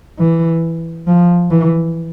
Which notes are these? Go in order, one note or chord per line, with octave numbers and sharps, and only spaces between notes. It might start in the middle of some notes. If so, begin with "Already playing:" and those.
E3
F3
E3